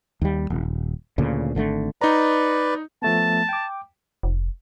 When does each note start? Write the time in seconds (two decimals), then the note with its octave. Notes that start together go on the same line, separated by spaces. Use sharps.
0.22 D#2 G3
0.50 D#1
1.18 D2 A#2 C#3
1.55 G#1 D3 E3 A3
2.01 D#4 B4 D5 A#5
3.02 F3 A3 B3 A5
3.49 G5 D6
4.23 F1